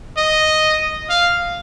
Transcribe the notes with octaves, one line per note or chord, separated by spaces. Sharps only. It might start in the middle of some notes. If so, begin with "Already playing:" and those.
D#5
F5